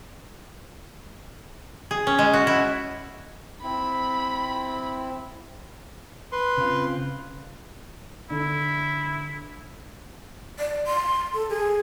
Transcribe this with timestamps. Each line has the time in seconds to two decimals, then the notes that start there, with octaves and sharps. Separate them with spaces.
1.91 G#4
2.07 C#4
2.19 G#3
2.33 F#4
2.47 E4
3.63 C4 E4 B5
6.32 B4 C6
6.58 C#3 C4 F4
8.30 D3 E4
10.59 D5
10.87 C6
11.35 A4
11.50 G#4